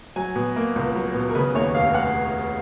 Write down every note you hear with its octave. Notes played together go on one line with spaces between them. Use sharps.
F#3 G#5
B2
A#3
C#2
F#3
B2
A#4
C#3 B4
D#2 C#5
F1 F5
F#5